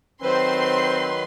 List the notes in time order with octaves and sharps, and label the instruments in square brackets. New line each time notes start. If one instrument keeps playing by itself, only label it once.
[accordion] D#3 F#3 B4 [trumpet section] C4 [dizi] C5 [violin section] C6